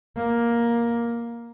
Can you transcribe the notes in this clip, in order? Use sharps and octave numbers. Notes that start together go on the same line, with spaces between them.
A#3